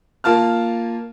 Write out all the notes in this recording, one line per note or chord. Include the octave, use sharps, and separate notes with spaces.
A#3 F4 A5 F6